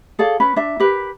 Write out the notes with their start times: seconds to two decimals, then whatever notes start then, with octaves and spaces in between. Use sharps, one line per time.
0.19 G#4 A4 D5 F5
0.40 C#4 B4 B5
0.56 D4 E5
0.80 G4 A#4 B4